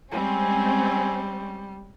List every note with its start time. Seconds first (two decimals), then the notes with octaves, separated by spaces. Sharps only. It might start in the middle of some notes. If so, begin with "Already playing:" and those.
0.11 G3 G#3 C4 C#4 G#5